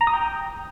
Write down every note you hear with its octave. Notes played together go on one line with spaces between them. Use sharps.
A#5
D#6
G5